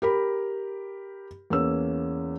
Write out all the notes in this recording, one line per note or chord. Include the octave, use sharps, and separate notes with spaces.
G4 A#4 B5
E2 A#3 C#4 E6